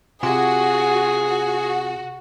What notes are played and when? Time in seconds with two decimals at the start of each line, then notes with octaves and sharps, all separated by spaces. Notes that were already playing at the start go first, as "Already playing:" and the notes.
0.23 C3 F4 F#4 G#4 G#5
1.26 F#4